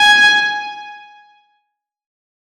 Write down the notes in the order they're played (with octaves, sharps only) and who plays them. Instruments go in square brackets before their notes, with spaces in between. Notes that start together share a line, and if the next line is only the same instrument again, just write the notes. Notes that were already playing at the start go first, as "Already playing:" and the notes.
Already playing: [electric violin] G#5